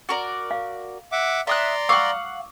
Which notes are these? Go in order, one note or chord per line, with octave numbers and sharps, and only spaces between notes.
F#4 A#4 D5
F5
E5 F#5 D6
D5 E5 A#5 C6 D#6 F#6
F5 F#5 C#6 D6 E6